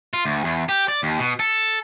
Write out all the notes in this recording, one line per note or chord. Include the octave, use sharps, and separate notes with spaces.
F4
D2
E2
G4
D5
D#2
B2
A4